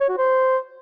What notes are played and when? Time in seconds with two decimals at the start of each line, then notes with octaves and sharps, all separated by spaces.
0.01 C#5
0.09 F#4
0.18 C5